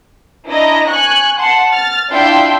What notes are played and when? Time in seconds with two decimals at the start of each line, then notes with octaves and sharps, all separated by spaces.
0.46 D4 E4 D#5 A#5
0.88 G#5 C#6 F#6
1.39 F#5 A5 C6
1.70 F6 A6
2.10 D4 E4 F4 E5 G5 C6